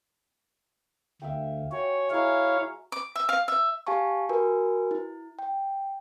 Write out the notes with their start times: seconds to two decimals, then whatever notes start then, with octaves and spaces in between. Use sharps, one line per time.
1.22 D2 E5 F5 G5
1.72 F#4 C#5 G5 G#5
2.11 G#3 E4 C#5 E5 F5 A#5
2.92 D6
3.15 E5
3.29 F5
3.48 E5
3.87 G4 F5 G#5 A5 C#6
4.29 F#4 A#4 B4 G#5
4.91 E4
5.39 G5